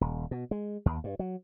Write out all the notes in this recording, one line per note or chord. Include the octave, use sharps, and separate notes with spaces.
D#1
B2
G#3
D#2
G2
F#3